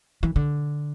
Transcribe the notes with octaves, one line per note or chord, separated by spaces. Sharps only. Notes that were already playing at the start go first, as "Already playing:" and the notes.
E3
D3